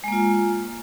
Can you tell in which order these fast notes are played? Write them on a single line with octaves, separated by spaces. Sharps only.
G#3 A#3 F4